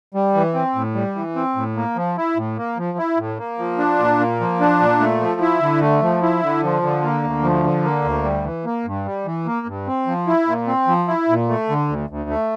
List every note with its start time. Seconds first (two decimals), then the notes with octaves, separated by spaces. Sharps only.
0.14 G3
0.35 E3
0.54 C4
0.75 A2
0.95 G3
1.15 E3
1.36 C4
1.56 A2
1.77 A#3
1.96 F3
2.17 E4
2.37 A2
2.57 A#3
2.78 F3
2.98 E4
3.18 A2
3.39 A#3
3.59 F3
3.78 D4
3.99 A#2
4.19 A#3
4.40 F3
4.60 D4
4.80 A#2
5.00 A3
5.20 F3
5.41 E4
5.61 D3
5.81 A3
6.02 F3
6.22 E4
6.42 D3
6.63 F3
6.82 D3
7.03 A#3
7.23 D2
7.43 F3
7.64 D3
7.84 A#3
8.04 D2
8.24 G3
8.44 E3
8.65 A#3
8.86 G2
9.05 G3
9.26 E3
9.46 A#3
9.67 G2
9.87 C4
10.07 F3
10.27 E4
10.47 A#2
10.67 C4
10.87 F3
11.08 E4
11.29 A#2
11.49 A3
11.69 D3
11.88 D2
12.10 D2
12.30 A3